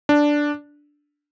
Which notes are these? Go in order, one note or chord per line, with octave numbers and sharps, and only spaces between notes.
D4